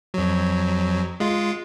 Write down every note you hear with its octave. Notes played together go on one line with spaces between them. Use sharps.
F2 F#3
G#3 F4